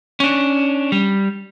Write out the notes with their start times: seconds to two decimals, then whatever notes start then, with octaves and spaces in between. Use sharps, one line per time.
0.20 C#4 D4
0.92 G3